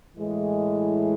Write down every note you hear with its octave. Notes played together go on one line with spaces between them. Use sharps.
A2 E3 G#3